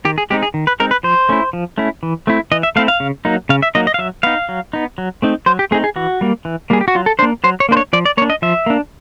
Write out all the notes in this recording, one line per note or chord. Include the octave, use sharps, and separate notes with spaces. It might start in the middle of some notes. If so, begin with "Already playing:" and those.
D#3 G4
G#4
G#3 C4 D#4 G4
G#4
D#3
B4
G#3 C4 D#4 A#4
B4
F3 C5
A3 C#4 E4
F3
A3 C#4 E4
E3
A3 C4 E4
E3 D#5
E5
A3 C4 E4 F5
F5
C#3
F#3 A#3 D#4
C#3 F5
E5
F#3 A#3 D#4 D#5
D#5
F5
F#3 E5
B3 D#4 F5
F#3
B3 D#4
F#3
A3 C4 D#4
F#3 C5
G4
A3 C4 D#4 G#4
G#4
E3 F#4
G3 A#3
E3
G3 A#3 G#4
G4
F#4
F#3 F4
A4
A#3 D4 C5
F#3 C5
C#5
A#3 D4 C5
C#5
F3 D5
D5
A#3 D4 C#5
D#5
F3 E5
A#3 D4